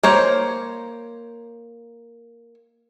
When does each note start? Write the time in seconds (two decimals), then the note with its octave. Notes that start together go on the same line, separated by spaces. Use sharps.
0.03 A#3 C5 C#5